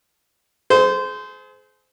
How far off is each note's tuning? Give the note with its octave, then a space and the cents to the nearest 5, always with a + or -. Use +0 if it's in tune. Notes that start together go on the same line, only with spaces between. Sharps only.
G#4 +35 C5 -20